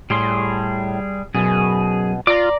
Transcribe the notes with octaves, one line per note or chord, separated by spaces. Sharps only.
A2 G3 G#4 C6
F#2 B2 G#4
F4 D5 A#5 D6